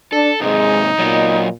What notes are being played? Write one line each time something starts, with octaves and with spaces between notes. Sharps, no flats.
D4 A4
G#2 C3 G#3 D#4
A#2 F#3 D#5